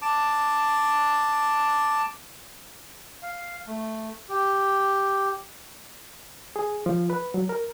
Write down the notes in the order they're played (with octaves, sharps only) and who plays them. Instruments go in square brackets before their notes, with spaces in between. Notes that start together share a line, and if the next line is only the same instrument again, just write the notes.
[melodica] A5 D6
F5
A3
G4
[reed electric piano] G#4
F3
B4
F#3
A#4